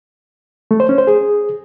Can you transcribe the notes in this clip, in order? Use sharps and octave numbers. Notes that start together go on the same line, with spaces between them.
A3
C5
C#4
C5
G#4